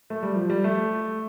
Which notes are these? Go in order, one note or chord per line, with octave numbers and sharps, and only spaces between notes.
A3
G3
F3
G3
A3